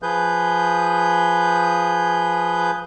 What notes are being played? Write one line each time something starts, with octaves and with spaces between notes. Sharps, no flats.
F3 G#4 B4 G6